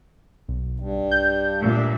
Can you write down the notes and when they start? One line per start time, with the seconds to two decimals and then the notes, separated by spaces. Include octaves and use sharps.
0.48 B1
0.80 G2
1.11 G6
1.61 A#2 D4 E5